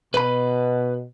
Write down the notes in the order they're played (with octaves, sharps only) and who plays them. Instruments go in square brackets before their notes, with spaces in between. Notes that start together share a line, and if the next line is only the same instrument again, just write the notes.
[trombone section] B2 [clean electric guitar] B4 B5